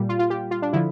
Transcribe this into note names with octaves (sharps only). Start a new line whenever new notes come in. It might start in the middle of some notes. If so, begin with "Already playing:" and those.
Already playing: A#2 G3
F4
F4
G4
F4
D4
D3 F3 E4